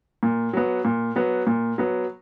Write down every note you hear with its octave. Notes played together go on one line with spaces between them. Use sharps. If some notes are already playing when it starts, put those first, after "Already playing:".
A#2
F#3 B3
A#2
F#3 B3
A#2
F#3 B3